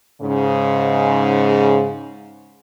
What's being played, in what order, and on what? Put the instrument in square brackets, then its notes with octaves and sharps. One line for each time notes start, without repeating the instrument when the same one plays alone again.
[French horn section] G#2 C#3